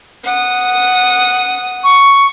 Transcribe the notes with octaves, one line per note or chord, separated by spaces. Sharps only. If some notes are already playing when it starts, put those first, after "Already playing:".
F#5 D#6
C#6